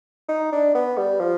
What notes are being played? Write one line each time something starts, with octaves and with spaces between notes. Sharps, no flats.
D#4
D4
B3
G3
F3